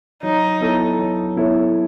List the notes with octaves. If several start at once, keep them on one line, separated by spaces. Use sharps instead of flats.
F#3 D#4
B3 E4 A4 C#5
F#3
B3 E4 A4 C#5